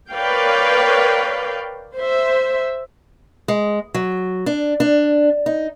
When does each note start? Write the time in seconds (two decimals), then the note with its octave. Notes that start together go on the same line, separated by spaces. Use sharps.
0.11 A#4 B4 C#5 D5 F5 G5
1.96 C5 E5
3.48 G#3
3.94 F#3
4.46 D4
4.80 D4
5.46 D#4